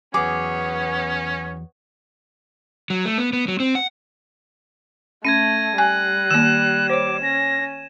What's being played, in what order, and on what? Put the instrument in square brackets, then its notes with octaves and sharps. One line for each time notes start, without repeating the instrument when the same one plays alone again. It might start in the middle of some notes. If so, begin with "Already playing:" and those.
[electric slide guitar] E2 F#3 [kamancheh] B3 C#5 [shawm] C#4 [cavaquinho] G#4 D6
[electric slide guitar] F#3
A3
B3
B3
F#3
C4
F#5
[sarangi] A3 [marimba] C#4 [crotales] G#6 A#6 D#7
[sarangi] G3 [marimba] G#5 [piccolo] F#6
[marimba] D#3 A#3 [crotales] E7
[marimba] C5 C#5 [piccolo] D6
[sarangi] C#4 [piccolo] A#6